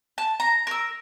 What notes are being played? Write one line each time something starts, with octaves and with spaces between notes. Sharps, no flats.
A5
A#5
A#4 E6